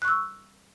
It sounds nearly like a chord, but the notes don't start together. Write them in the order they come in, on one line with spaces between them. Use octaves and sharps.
F#6 C#6 E6